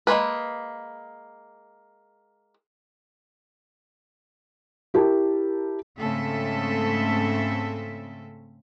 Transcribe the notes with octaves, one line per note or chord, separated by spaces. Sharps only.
G#3 A#3 B4
E4 G4 A#4 A5
G#2 C#3 A3 C4 A4 E5